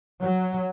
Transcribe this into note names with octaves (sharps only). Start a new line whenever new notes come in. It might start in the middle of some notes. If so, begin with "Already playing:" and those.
F#3